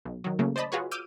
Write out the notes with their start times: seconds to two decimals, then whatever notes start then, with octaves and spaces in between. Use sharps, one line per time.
0.05 B1
0.24 D#3 F#3
0.39 C#3 F#3 A3 A#3
0.56 C5 D5 D#5 A5 B5
0.72 F4 F#4 G#4 B4 C#5
0.91 D6 E6 F6 G6 D#7